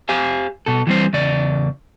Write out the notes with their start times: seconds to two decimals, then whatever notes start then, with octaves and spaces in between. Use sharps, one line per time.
0.09 G4 C5 F5 G#5
0.66 B2 A4
0.87 E3 G3 C4 C5
1.13 E2 C#3 D5